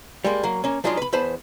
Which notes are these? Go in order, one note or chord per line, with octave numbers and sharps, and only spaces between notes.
G3 G#3 A#3
F#3 A#3
A#3 C#4
F3 F#3 G#3 D4 D#4 F4
B4 B5
E2 B4 C5 A5 B5